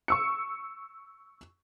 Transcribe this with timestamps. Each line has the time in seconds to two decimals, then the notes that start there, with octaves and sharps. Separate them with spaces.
0.08 C#6 E6 C#7